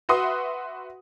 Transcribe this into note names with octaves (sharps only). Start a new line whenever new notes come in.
F#4 B4 E5 F#5 C6 D#6